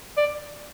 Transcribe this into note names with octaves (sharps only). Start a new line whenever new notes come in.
D5